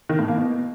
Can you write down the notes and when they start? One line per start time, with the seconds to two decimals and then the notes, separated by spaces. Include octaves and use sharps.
0.09 D#3
0.19 A2
0.28 A#3
0.38 B2